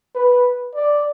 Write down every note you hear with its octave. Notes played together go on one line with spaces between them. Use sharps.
B4
D5